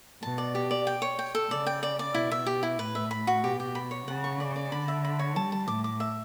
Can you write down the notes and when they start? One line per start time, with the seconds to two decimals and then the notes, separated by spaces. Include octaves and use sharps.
0.22 B2 A5
0.38 D5
0.55 G4
0.71 D5
0.87 G5
1.02 C#5
1.19 G5
1.35 A4
1.50 C#3 D5
1.66 G5
1.83 D5
1.99 D5
2.14 B2 E4
2.31 E5
2.46 G4
2.63 E4
2.79 A2 B4
2.95 E5
3.11 B5
3.27 F#4
3.44 B2 G4
3.60 G4
3.75 B5
3.91 C#5
4.07 C#3 F#5
4.24 C#6
4.40 D5
4.56 D5
4.71 D3 B5
4.88 E5
5.05 B5
5.19 C#5
5.36 G3 A5
5.52 A5
5.68 A2 D6
5.84 D6
6.00 E5